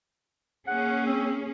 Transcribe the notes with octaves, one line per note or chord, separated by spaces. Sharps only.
A#3 C#4 G#4 F#5
C4